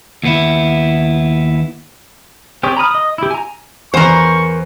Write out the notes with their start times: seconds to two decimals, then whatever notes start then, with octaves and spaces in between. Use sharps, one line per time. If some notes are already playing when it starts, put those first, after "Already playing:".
0.23 D#2 B3 E4
2.63 C4 G4 G#4 C#5 D5
2.77 A#5 B5 D#6 F6
2.91 D#5 D#6
3.18 E4 G4
3.31 G#5 A#5
3.94 E2 A#4 C5 C#6